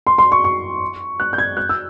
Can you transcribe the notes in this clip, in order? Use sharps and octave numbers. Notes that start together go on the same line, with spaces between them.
C6
C6
C#6
C#6
F#6
G6
G#6
F#6
E6